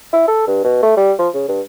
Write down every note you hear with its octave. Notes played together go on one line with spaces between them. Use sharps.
E4
A4
G2
B2
A3
G3
F3
C#3
G2